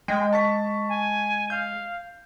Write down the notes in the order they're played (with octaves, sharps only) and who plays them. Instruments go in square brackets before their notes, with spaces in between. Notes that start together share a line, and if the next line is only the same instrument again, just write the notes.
[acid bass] G#3 [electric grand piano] G5
[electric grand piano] A5 C#6 B6
[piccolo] G#5
[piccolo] F5 [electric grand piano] G6